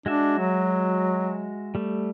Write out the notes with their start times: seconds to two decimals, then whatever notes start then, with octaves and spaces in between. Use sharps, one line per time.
0.06 G#3 D4 F#4 E5
0.39 F#3
1.75 G3 A3